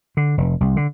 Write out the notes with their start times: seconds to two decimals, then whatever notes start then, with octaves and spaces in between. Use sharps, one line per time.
0.17 D3
0.37 F1
0.60 C2
0.77 D3